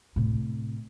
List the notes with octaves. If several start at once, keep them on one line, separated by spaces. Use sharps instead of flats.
A2 C3